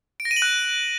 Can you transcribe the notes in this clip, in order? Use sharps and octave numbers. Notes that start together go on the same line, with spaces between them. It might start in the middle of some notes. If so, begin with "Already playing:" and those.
D7
A#6
D#7
F#7
F#6